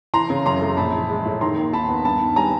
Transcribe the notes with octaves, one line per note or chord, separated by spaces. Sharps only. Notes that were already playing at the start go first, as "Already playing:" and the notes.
E3 A#5 C6
C#3
F#2 A#5 C6
A3
A#1 A5 B5
E3
G#3
A2
D#3 A#5 C6
D#2
D#2 A5 B5
B3
G2 A5 B5
D#3
G3 G#5 A#5